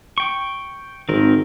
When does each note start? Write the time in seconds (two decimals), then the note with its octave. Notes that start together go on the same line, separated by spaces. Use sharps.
0.18 G5 C#6
1.09 G#1 D#3 C4 A#4